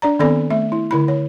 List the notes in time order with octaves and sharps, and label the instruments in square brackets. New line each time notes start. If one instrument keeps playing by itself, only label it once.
[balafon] D4 D5 A#5
D#3 B3 C4 A4 D5 B5
A3 E5
E4
D3 E4 B5
C#5